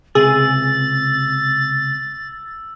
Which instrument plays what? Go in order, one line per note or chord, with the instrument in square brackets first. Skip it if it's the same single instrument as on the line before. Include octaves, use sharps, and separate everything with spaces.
[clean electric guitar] C#2 C3 [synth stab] G#4 [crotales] E6 [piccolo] A6